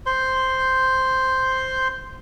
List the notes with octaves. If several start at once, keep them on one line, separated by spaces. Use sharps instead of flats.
C5 C6